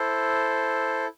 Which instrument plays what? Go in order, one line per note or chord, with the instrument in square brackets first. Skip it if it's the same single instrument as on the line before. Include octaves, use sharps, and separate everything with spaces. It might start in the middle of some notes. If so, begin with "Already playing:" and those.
Already playing: [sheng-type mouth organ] E4 A4 C5